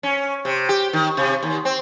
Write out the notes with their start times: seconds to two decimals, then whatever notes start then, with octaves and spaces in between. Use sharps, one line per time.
0.03 C#4
0.45 C3
0.69 G4
0.93 D#3
1.17 C3
1.43 D#2
1.65 C4